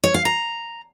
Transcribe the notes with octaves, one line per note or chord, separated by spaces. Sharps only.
C#5
F5
A#5